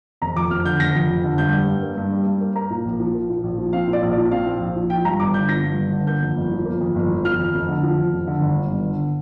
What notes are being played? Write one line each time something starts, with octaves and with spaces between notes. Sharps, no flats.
F1 A#5
F2 D6
F1 F6
D3 G6
F1 A#6
F2
F1
D3
G2 G6
G3
G2
A#3
G2
G3
G2
A#3
A#3 A#5
A#2
A#1
F3
A#3
A#2
A#1
F3
C4 F5
A#2
D5
A#1
D5
F3
C4 F5
A#2
A#1
F3
F3 G5
G2 A#5
G1 D6
D3 G6
F3 A#6
G2
G1
D3
A#3 G6
F2
G1
F3
A#3
F2
G1
F3
F3 F6
F2
F1
D3
F3
F2
F1
D3
G1
G2
G1
D3